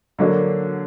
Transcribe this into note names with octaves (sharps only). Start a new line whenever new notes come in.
D3 F#3 A#3 D4